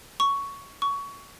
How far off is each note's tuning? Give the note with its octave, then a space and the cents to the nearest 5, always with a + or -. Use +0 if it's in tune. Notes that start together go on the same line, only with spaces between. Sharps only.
C#6 +10
C#6 +20